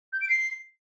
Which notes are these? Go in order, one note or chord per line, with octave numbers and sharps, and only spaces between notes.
G6
D7
C7